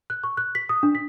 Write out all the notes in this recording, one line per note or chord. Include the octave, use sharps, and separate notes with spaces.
F#6
C#6
F#6
B6
D#6
D4
B6